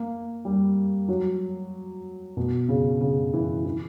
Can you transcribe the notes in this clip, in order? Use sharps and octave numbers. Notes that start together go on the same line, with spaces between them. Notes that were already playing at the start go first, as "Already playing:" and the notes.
Already playing: A#3
G3
F#3
B2
C#3
C#3
E3
E3